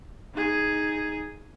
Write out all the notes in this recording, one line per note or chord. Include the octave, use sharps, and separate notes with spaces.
D#4 G#4